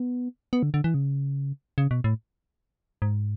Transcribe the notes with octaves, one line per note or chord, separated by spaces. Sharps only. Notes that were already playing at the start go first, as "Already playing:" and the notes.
Already playing: B3
B3
D3
D3
E3
C#3
C#3
B2
A2
G#2